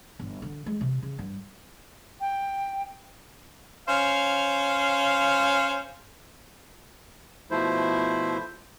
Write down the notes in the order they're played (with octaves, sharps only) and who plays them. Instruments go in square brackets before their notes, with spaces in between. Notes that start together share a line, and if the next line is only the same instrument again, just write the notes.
[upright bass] G1
D3
G#3
C3
C#3
G2
[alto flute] G5
[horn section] C#4 C5 F5
[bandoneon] B2 F3 A3 E4 C5